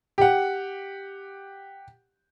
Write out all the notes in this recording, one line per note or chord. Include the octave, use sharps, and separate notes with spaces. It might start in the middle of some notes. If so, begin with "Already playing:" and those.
G4 F#5